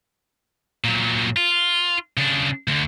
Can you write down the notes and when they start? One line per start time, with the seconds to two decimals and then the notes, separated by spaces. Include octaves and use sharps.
0.84 A#2 F#3
1.37 F4
2.17 C#3 D4
2.68 D2 D3